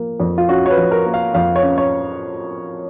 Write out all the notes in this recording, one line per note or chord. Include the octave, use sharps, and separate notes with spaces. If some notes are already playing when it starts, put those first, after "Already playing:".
Already playing: F3 A#3
F2
F4
C#4 F#4
C#5
B4
F3
A#4
A#3
F5
F2 F5
C#5
C#4
C#5